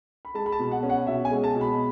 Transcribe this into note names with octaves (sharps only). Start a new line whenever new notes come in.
B5
G#3 A5
B5
A5
B2
F#5
C#4
F#5
B2 E5
G#5
G#3
A5
B2
B5